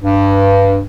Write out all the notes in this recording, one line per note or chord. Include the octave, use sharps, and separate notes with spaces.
G2